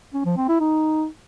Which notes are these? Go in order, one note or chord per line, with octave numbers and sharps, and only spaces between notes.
C#4
F3
C4
E4
D#4